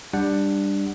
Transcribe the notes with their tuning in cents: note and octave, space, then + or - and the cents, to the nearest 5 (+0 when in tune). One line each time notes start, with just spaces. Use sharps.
G3 +15 D4 +5 F#5 +0